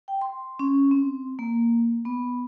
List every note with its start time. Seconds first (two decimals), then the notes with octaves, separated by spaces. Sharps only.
0.08 G5
0.22 C6
0.59 C#4
0.91 C4
1.39 A#3
2.05 B3